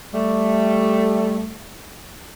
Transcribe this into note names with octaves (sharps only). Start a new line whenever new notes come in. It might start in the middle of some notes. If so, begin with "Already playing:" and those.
G3 A3